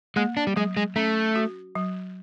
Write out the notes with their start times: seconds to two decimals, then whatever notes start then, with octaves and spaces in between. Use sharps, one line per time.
0.16 G#3 A#3
0.37 D4
0.47 G3
0.56 F#3 G#3
0.77 G#3
0.96 A3 C#4
1.36 F#4
1.75 F#3